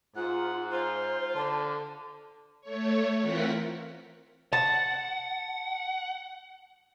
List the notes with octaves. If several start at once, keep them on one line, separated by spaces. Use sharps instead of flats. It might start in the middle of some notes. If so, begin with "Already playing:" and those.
G#2 F4 F#5
F4 C5
D3 A5
A3 C#5
E3 C4 F4 A#4 F#5 B6
F#5 A5